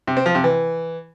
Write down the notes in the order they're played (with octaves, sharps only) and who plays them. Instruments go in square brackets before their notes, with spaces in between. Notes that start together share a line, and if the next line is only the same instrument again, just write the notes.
[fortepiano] C3
C4
F3
C3
E3